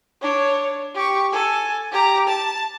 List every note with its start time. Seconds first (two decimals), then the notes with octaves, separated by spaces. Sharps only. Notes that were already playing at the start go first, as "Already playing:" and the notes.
0.22 D4 C#5
0.95 G4 C#6
1.32 A4 G#5
1.91 G4 A#5
2.27 A5